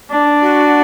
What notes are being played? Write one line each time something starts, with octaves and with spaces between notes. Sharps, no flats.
D4
F#4